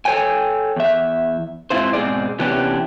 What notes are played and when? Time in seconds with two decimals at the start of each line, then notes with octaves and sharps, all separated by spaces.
0.05 A4 A#4 C#5 G5 G#5
0.76 E2 E5
1.70 G#2 C4 E4 F4 C5
1.93 G#2 B2 C4 G#4 D5
2.39 C3 E3 B3 C#4 D4 G4